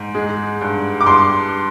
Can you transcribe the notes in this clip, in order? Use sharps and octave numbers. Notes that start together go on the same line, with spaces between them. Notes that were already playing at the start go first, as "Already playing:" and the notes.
Already playing: G#2
G#3
G2
D6
G2 C6